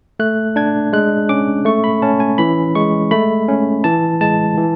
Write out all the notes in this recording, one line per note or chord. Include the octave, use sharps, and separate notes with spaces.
A3 F#6
D4 G#6
G#3 F#6
C#4 D6
A3 C#6
B5
C#4 A5
G#5
E3 B5
G#3 C#6
A3 B5
C#4
E3 A5
G#3 A5
E3